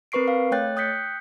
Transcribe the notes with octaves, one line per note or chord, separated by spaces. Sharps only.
C4 A#4 B4 C#6 C7 D7
F5
A3 C#5 G5 F#6 A6
G5 D#6 F#6 G6 B6 C#7